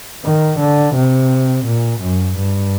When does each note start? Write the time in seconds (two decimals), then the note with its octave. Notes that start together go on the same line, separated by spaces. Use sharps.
0.25 D#3
0.59 D3
0.95 C3
1.66 A#2
2.02 F#2
2.37 G2